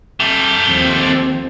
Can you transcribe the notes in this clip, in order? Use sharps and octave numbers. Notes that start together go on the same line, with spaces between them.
A3 G4
D#2 F3 C4